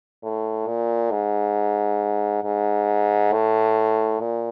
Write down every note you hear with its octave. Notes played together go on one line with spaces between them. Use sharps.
A2
A#2
G#2
G#2
A2
A#2